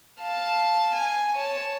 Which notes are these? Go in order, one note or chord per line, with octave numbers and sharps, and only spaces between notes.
F5 A5
G#5
C#5 A5